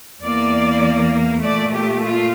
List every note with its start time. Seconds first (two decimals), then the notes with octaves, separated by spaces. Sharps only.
0.22 E2 E3 A#3 D5
1.43 A#2 A3 D5
1.73 G4
2.03 F4